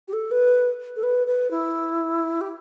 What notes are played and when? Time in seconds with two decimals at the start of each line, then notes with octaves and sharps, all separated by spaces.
0.08 G4
0.13 A4
0.31 B4
0.96 A4
1.03 B4
1.27 B4
1.51 E4
2.41 G4